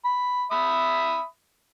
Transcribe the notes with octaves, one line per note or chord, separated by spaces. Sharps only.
B5
E5 B5 D#6